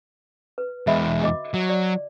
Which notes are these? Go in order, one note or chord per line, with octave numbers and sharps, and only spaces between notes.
B4
E2 G#3 D#5 E5 B5
F#4 D#5 D6
F#3
D5